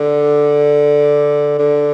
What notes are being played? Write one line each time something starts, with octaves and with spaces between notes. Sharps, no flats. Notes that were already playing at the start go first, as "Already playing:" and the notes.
Already playing: D3
D3